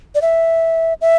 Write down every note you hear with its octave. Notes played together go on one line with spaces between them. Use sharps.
D5
E5
E5